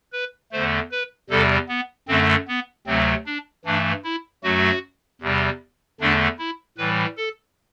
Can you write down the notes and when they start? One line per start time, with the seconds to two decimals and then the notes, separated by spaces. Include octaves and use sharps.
0.13 B4
0.52 E2 D3 A3 C5
0.91 B4
1.30 E2 C3 G3 A4
1.69 B3
2.08 F#2 D3 A3 C4
2.48 B3
2.86 D2 C3 F#3 A3 C4
3.26 D4
3.65 G2 E3 A3 D4
4.04 E4
4.43 F#2 F#3 A3 F#4
5.21 E2 C3 G3
6.00 E2 D3 A3 D4
6.39 E4
6.78 A2 E3 G3 B4
7.17 A4